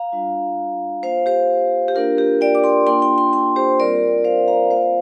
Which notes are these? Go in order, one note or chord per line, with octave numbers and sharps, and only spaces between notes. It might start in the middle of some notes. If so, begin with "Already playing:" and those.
Already playing: F5 A#5
G3 D4 F4
A#3 F4 C5 F5
G4 C5
G4
A#3 D4 F4 A#4
G4
D5 G5
D6
G5 C6
A#3 D4 F4 G5 C6
G5 C6
G5 C6
G5 C6
G4 C5
G3 C4 F4 A#4 D5
C5 F5
F5 A#5
A#3 F4 C5 F5